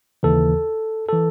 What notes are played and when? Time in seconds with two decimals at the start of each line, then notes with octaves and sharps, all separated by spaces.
0.23 D#2 C#3 E3 A4
1.09 E3 A4